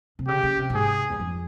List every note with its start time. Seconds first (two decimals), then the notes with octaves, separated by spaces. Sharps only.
0.19 C3
0.27 C#3 G4
0.43 C#3
0.59 C3
0.70 A#2
0.74 G#2 G#4
1.10 E2
1.20 F2